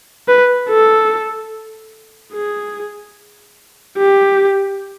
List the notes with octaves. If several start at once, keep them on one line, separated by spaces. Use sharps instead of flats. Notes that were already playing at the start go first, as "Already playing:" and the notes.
B4
A4
G#4
G4